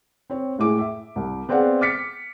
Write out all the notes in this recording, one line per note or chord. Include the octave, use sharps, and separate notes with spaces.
C4 C#5
A2 G#3 E4 G#4 D6
E5
C2
B3 C4 G#4 D5 F5 F#5
D6 F6 A6 B6 C#7